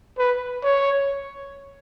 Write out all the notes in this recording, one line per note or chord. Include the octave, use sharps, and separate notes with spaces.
B4
C#5